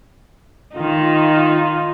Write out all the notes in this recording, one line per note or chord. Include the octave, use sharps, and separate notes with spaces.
D#3 D#4 F4